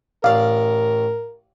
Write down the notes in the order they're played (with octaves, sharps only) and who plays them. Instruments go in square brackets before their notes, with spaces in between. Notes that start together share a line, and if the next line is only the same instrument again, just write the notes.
[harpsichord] A1 D5 [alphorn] A#4 [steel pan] F5